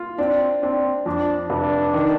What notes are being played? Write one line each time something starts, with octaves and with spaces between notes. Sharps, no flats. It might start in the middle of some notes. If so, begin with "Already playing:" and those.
Already playing: F4
C4 D4
C4 D4
F2 D4
F1 D4
D#3